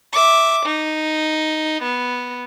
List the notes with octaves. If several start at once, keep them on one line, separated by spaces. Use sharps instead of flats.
E5 D6
D#4
B3